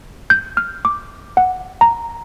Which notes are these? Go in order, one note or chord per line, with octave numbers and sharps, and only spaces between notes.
G6
F6
D6
F#5
A#5